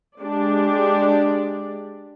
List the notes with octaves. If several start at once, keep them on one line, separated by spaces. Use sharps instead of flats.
G#3 D4 G4 D5